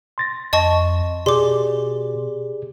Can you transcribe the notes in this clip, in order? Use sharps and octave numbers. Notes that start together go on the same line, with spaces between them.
C6 A6 A#6
F2 D#5 A5 C#6
B2 G4 G#4 D5 C6 D6